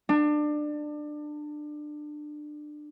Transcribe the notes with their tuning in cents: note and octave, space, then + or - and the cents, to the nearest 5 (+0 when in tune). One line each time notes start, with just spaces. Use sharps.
D4 +25